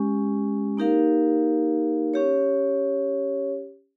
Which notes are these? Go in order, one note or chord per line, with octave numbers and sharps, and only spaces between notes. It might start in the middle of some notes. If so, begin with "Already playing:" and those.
Already playing: G#3 C#4 G4
A#3 D#4 G4 A#4 F5
C#4 G4 C#5